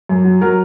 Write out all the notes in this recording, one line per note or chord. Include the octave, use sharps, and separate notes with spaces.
F#2
F#3
F#3 A#4